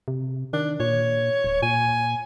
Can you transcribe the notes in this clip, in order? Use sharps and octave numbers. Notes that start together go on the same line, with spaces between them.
C3
D#3 D4
A#2 C#5
D1
A#2 G#5